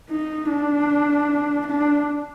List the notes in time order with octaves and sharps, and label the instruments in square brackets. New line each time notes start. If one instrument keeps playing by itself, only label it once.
[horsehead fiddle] D#4
D4
D4